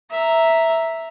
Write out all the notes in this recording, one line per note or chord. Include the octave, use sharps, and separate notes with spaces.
E5 A#5